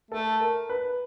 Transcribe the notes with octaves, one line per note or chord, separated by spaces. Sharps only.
A3 A4
A#4
B4